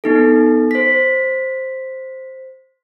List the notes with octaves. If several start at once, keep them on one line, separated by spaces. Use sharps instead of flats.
B3 D#4 A4
C5 B6